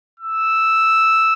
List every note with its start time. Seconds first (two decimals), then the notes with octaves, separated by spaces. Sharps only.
0.20 E6